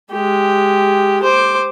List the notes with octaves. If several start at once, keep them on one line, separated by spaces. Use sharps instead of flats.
G#3 G4
C5 D6